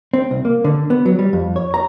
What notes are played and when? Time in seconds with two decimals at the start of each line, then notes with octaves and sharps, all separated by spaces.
0.14 C4
0.31 C2
0.45 A#3
0.64 D3
0.90 B3
1.06 F#3
1.19 G3
1.33 F2
1.56 C#5
1.74 A#5